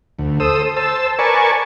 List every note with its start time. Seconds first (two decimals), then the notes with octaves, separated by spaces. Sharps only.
0.19 D2
0.40 A4 C5 D#6 E6
0.77 C5 A5 E6
1.19 A#4 B4 D5 G#5 A5 C#6